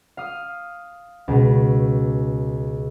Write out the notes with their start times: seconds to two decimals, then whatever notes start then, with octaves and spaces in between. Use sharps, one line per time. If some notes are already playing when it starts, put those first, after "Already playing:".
0.17 F5 D#6
1.28 C#2 B2